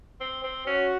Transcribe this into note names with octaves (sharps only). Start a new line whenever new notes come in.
C4
C4
C#4 F#4